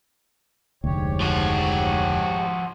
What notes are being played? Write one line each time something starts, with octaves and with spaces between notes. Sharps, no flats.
F1 D2 G#2 G4 C#5
F3 F#4